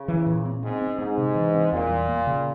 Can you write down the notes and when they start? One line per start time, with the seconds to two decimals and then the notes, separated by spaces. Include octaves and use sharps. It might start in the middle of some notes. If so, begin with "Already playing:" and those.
Already playing: C#3
0.08 E3
0.26 A#2
0.45 C4
0.63 G#2 C4
0.82 C4
0.99 G#2 C4
1.18 C3
1.35 E3
1.54 C4
1.72 E2 A#2
1.89 G3
2.08 A#3
2.27 C#3